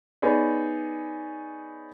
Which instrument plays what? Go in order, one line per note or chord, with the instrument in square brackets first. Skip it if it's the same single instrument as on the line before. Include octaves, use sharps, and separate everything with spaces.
[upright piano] B3 D#4 G#4 C#5 D5